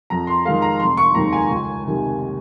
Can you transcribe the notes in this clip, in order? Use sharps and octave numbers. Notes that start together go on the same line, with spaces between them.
F2 A#5
C6
D#3 G#3 F5
A#5
F1 C6
C#6
D#2 D#3 G#3 A#5
G#5
C#2
C3 D#3